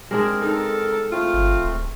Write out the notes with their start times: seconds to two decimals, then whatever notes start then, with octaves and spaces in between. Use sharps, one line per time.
0.11 G#3 C4 D4 G#4 A#4
0.42 D#4 A4
1.12 A3 C4 F4
1.33 G1
1.60 D1